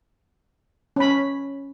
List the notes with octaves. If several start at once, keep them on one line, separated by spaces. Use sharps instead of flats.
C#4 B5